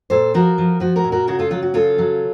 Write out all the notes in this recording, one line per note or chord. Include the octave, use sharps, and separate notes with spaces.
A#2 A4 C5
F3 F#4 A#4
F3
F3 F#4
F#4 A#4
A#2
F#4 A#4
C#3 F#4 A#4
F4 A4
F#3 F4
F#4
C#3 F4 A4
F#3